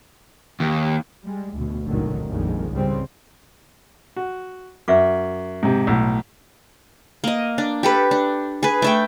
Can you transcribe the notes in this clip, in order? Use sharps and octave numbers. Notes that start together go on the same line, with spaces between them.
D#2
G3 G#3
D2 B2
F1 C#2 A#2 D3 D#3 F#3
A#1 F2 D#3 G3 G#3
C#2 G#2 C#3 G3 C4
F#4
F#2 B4 E5 D6
G#2 C3
B1 A2
A#3 D#5
D4
G4 A4 B4
D4
G#4 B4
A3 E5 G5